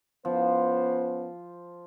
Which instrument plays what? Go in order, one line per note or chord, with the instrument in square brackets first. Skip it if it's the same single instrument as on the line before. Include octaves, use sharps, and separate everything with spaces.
[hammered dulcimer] F3 [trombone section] B3 C#4 C5